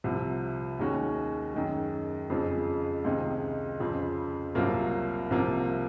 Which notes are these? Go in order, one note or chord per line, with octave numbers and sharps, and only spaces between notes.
C2 C3 F3
D#2 D#3 G#3 C#4 F#4
F#2 D#3 G#3
F2 C#3 F3 G#3
C#2 C3 D#3 G#3 D#4
F2 C#3 F3 C4
C2 C3 F#3 A#3 F4
C2 C3 F3 A#3